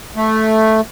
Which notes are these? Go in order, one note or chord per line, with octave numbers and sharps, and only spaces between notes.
A3